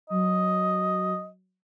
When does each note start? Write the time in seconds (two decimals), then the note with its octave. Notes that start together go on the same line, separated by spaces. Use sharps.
0.10 F#3 D#5